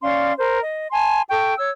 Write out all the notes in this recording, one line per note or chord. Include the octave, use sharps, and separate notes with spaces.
C#4 D5 F5 C6
A#4 C5
D#5
G#5 A5 C6
A4 G5 C#6
C#5 E6